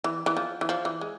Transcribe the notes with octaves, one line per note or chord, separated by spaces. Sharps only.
E3
E3
F3
E3
F3
E3
G#3